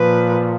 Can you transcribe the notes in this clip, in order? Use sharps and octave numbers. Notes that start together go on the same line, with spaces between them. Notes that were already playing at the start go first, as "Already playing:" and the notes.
Already playing: A#2 F3 B4